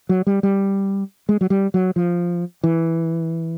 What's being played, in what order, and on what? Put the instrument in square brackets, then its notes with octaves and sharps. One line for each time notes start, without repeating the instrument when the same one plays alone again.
[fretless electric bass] F#3
G3
G3
G#3
F#3
G3
F#3
F3
E3